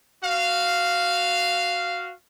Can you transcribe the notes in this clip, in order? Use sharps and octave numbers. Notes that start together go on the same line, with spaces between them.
F#4 F5